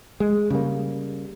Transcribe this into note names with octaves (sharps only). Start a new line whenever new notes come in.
G#3
C#3 G3 A#3